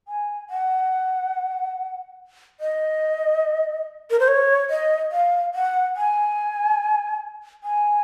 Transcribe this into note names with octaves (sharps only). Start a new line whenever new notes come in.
G#5
F#5
D#5
A#4
C5
C#5
D#5
F5
F#5
G#5
G#5